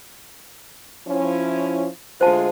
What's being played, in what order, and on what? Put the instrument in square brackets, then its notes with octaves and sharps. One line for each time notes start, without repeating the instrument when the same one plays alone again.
[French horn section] F3 C#4 E4
[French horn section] D2 G#3 F4 [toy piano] C5 A5